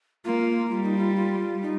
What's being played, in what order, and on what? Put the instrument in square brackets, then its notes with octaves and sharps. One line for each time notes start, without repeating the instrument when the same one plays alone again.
[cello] A#3 [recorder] F4
[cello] G3 [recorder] F4
[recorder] D#4
F4
F4
D#4